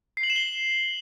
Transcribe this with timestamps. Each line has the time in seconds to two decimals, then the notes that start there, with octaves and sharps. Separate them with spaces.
0.17 C7
0.23 F#7
0.30 E7
0.36 G7